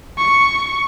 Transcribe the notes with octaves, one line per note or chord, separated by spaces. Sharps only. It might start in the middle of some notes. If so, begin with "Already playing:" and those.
C#6